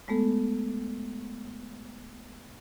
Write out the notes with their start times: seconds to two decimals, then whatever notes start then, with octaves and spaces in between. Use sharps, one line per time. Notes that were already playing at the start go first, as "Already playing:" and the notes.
0.08 G#3 A3 B3 A4